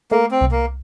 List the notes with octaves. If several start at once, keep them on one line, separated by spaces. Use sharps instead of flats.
A3 A#3
C4
C2
A#3